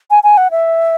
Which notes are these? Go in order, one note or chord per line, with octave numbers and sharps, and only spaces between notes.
G#5
G#5
F#5
E5